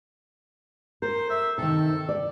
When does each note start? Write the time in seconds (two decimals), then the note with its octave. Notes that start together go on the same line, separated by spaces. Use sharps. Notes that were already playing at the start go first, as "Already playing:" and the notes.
1.02 A#4 C5
1.30 E5
1.58 C3 D#3 A4
2.09 D5